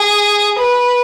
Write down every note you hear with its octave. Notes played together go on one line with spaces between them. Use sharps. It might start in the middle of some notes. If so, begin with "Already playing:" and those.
Already playing: G#4
B4